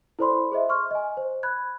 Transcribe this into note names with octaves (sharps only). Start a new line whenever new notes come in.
E4 A4 C5 D5 B5 C6
G#4 C5 D#5 E5
C6 C#6 F6
D#5 G#5
C5
B5 F#6 G#6